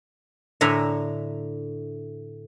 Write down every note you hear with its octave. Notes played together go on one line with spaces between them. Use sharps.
A2 D3 E5 G#5 A#5